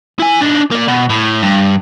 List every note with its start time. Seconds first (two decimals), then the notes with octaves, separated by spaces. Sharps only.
0.20 E4 G#5
0.42 D4 D#4
0.72 A#3 D5
0.88 B2
1.10 A2
1.42 G2